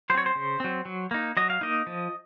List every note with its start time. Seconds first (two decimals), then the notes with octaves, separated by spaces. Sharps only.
0.10 F#3 C5
0.14 C4 C#5
0.26 C5
0.36 C#3
0.60 F#3 C4
0.85 F#3
1.11 A#3 D#4
1.37 F#3 D#5
1.50 F5
1.61 A#3 D#4 D#5
1.87 F3